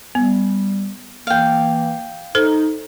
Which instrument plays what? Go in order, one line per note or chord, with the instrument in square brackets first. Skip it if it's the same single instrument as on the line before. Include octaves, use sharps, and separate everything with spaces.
[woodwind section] G3 [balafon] B3
[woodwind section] E3 A#3 [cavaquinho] F5 G5
[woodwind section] D#4 [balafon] A4 C5